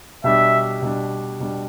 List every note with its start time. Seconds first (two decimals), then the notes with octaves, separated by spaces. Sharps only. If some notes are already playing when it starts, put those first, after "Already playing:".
0.24 B2 G3 D4 E5
0.82 B2 G3 D4
1.40 B2 G3 D4